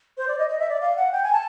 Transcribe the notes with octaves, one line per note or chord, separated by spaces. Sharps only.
C5
D5
D#5
D#5
E5
D5
F5
F#5
G5
G#5
A5